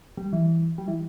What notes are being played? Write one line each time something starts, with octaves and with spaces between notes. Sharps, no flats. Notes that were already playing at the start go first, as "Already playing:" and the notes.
G3
E3
G3
E3